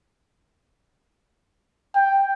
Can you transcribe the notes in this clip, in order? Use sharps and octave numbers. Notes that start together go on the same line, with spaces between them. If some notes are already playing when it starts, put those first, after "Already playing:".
G5